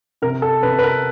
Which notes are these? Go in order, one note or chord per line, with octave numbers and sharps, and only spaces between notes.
C3 A#4
A4
C3 B4
B4
A#4